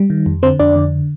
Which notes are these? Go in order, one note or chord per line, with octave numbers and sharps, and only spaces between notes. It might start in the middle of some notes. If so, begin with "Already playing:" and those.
Already playing: G3
D#3
F2
D3 C4 C5
F2 D4 D5
D3